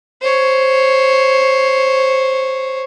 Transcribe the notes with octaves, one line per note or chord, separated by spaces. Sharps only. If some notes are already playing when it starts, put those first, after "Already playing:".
C5 C#5